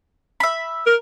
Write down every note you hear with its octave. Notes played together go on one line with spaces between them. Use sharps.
E5 B5
A#4